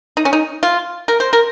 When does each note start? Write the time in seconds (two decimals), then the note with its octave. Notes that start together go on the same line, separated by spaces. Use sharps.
0.17 D#4
0.25 C#4
0.33 D#4
0.63 F4
1.08 A#4
1.20 C5
1.33 A#4